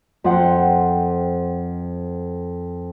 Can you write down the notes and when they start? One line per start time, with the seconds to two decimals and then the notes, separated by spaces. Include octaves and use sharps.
0.24 F2 C5 F#5 G5